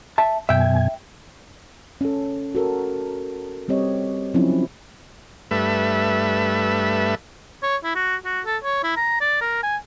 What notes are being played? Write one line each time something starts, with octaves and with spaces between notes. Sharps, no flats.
E5 A5
F#2 B2 E5 G5 G#5
C#4 A4
F#4 A4 A#4
G3 C4 G4 C#5 D#5
F3 F#3 C4 C#4 D#4 E4
G2 A3 B4 E5
C#5
E4
F#4
F#4
A4
C#5
E4
A#5
D5
A#4
G#5